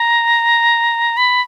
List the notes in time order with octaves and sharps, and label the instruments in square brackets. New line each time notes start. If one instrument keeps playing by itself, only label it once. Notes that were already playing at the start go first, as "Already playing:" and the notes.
Already playing: [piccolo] A#5
B5